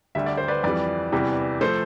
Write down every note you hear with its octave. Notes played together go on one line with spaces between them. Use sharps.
D2 D3 G3 E5
D5
C5
B4 D5
F2 E3 G3 B4 D5
E2 C3 E3 G3
F3 A3 A4 C5